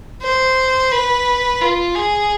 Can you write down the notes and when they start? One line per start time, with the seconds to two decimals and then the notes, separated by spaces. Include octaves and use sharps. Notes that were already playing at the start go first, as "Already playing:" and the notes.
0.23 C5
0.92 B4
1.61 F4
1.96 G#4